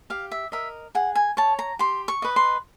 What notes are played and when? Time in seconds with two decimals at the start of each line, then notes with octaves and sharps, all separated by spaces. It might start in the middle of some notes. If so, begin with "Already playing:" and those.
0.10 G4 F5
0.31 E5
0.52 A#4 D#5 E5
0.95 G#4 F#5
1.15 G#5
1.37 C#5 A5
1.59 A#5
1.79 G4 C6
2.08 C#6
2.22 B4 D#5
2.36 C6